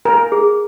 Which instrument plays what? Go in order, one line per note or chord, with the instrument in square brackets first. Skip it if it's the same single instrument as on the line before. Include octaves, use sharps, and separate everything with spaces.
[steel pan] A#4 [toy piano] G#5
[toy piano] G#4